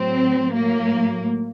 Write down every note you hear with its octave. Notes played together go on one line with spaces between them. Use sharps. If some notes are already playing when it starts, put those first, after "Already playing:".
Already playing: A2 F#3 C4
A2 F#3 A#3